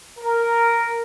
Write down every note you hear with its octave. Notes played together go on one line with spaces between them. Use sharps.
A#4